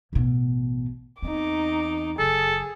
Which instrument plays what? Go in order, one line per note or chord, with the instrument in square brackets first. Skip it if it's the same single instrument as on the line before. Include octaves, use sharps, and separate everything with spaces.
[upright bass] A1 B2
[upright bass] E2 C4 [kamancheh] D#4 D6
[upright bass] F#1 [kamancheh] G#4 [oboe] A4